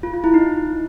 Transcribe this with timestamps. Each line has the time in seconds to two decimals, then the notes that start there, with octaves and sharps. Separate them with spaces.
0.03 F4
0.14 F4
0.24 E4
0.34 D#4